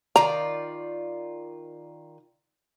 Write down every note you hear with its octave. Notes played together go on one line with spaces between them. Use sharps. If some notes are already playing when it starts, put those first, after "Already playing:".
D#3 F4 D5 A#5